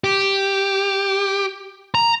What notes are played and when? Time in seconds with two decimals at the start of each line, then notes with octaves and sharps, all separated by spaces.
0.04 G4
1.95 A#5